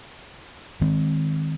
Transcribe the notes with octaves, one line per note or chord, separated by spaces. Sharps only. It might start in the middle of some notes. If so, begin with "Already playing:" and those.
D#3 G#3 C4